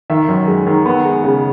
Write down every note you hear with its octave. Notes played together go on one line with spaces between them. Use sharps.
D#3 E5
F#2
G#3
D#3
B3
G#3
C#3